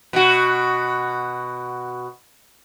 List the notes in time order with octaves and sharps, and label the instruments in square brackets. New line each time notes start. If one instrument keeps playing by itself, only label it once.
[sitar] B2 F#4